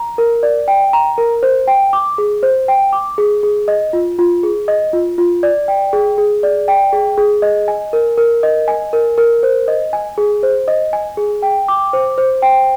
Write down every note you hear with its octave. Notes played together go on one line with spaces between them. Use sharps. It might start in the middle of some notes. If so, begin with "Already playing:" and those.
Already playing: A#5
A#4
D5
G5
A#5
A#4
C5
G5
D6
G#4
C5
G5
D6
G#4
G#4
D#5
F4
F4
G#4
D#5
F4
F4
D5
G5
G#4
G#4
D5
G5
G#4
G#4
D#5
G#5
A#4
A#4
D#5
G#5
A#4
A#4
C5
D#5
G#5
G#4
C5
D#5
G#5
G#4
G5
D6
C5
C5
G5